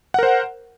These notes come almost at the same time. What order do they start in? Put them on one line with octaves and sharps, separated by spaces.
F#5 A#4 C5